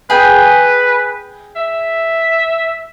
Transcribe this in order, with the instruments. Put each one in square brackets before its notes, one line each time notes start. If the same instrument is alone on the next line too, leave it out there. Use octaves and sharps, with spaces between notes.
[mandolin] G#4 G5 [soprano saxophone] B4
[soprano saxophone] E5